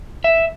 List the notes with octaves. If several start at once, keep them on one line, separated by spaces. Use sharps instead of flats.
E5